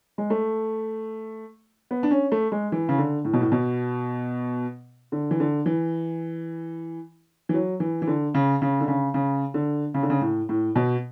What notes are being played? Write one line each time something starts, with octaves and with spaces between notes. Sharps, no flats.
G#3
A3
B3
D4
C#4
A3
G#3
E3
C#3
D3
A2
B2
A2
B2
D3
E3
D3
E3
E3
F#3
E3
E3
D3
C#3
C#3
D3
C#3
C#3
D3
C#3
D3
C#3
A2
A2
B2